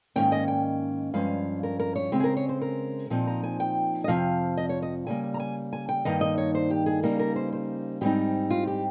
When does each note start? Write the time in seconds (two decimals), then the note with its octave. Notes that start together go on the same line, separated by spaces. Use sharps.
0.16 G#2 D#3 A#3 C#4 G5
0.32 D#5
0.48 G5
1.14 G2 F3 G#3 C#4 F5
1.63 A#4
1.79 A#4
1.95 C#5
2.12 C#3 G#3 C4 G4
2.20 G#4
2.24 A#4
2.37 C#5
2.49 C5
2.61 A#4
3.10 A#2 F3 C4 D#4
3.27 A#5
3.43 G#5
3.60 G5
4.04 D#5
4.08 F2 C3 F3 F5
4.57 D#5
4.69 C#5
4.82 D#5
5.07 C#3 G3 A#3 G#5
5.24 G#5
5.34 A#5
5.40 G#5
5.73 G#5
5.89 G5
6.05 G2 D#3 A#3 D#4 D#5
6.21 D#5
6.38 C#5
6.55 C5
6.70 G4
6.86 G#4
7.03 C#3 G3 A#3 D#4 A#4
7.19 A#4
7.36 C5
7.53 C5
8.01 G#2 G3 C4 D#4 G4
8.50 F4
8.67 G4